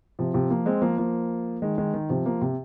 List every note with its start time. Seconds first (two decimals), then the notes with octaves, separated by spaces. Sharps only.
0.19 C3 F3
0.34 C3 F3
0.50 F3 A#3
0.66 G#3 C4
0.82 F3 A#3
0.98 F3 A#3
1.62 D#3 G#3
1.78 D#3 G#3
1.94 D#3
2.09 C3 F3
2.26 F3 A#3
2.41 C3